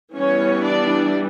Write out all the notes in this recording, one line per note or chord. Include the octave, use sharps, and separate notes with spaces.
E3 G3 B3 C#4 C#5
D4 D5